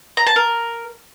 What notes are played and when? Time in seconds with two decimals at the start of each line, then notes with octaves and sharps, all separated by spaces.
0.17 A#5
0.27 A5
0.36 A#4